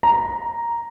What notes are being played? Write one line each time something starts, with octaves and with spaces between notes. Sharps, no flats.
A#5